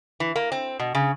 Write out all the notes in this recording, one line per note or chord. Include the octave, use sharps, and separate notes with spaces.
E3
A#3
C4
B2
C#3